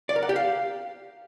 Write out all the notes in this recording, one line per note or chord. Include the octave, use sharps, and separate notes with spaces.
D5
A#4
F#5
G4
F5